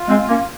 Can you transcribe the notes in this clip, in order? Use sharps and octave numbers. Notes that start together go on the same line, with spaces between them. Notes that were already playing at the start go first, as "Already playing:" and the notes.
Already playing: F4
G#3 C4
A#3 C#4